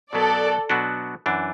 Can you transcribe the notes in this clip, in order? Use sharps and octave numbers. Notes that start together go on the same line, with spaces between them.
B2 F#3 B3 A4 D5
B2 F#3 B3 D4 F#4
F#2 E3 D4